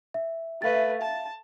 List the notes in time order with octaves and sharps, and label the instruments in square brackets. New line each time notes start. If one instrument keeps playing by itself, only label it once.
[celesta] E5
[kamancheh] A3 B4 [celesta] E5 F5 A6
[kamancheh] A5